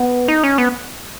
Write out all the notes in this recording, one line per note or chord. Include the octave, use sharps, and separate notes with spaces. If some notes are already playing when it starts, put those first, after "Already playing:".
Already playing: B3
D#4
C#4
B3